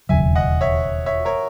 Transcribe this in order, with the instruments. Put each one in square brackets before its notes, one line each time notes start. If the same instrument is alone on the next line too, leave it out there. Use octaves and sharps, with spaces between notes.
[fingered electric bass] E1 D#2 C#3 F#3 [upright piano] E5 G#5
[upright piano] D#5 F#5
C#5 E5
C#5 E5
A#4 C#5